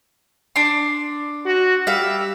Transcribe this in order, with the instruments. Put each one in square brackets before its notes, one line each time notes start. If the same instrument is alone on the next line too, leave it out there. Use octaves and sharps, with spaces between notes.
[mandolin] D4 C6
[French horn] F#4
[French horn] G3 [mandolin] E5 F5